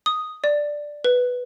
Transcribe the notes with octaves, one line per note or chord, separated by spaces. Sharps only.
D#6
D5
B4